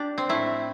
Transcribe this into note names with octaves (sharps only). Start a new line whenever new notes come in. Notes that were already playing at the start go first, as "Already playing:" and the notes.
Already playing: D4 G4
C4
A2 A3 E4